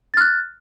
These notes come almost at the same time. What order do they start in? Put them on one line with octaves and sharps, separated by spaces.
A6 F6 F#6